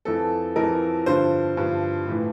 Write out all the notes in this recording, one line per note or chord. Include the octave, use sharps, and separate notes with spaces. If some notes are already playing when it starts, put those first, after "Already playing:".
F2 E3 A4
F2 E3 A#4
G2 D3 F3 C5
G2 D3 F3
A2 E3